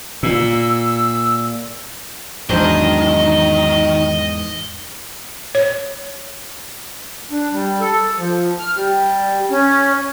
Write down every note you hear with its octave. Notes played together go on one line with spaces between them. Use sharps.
A#2 E6
E2 G#2 D#3 F#3 D4 C5 D#5
C#5
D4
G3
A4
F3
F6
G3
C#4